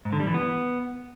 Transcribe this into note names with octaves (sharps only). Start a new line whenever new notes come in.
G#2
D3
G3
E3
B3